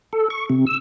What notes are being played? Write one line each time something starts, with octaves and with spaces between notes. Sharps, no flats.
A4
C#6
C3
E6